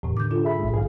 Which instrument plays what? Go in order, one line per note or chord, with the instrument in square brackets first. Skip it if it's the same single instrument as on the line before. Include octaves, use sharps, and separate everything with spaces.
[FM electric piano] E2 [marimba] A2 C3
[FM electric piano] D3 [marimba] D6 G6
[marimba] D4 F4 A4
[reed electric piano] G#4 E5 B5
[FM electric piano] A1 G#2
[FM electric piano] A#1 D#3 [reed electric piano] G#4 F5